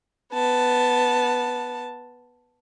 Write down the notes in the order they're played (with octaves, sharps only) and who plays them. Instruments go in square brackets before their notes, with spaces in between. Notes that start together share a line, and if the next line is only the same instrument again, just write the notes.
[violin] B3 A5